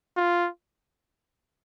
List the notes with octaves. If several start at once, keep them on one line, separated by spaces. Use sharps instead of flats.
F4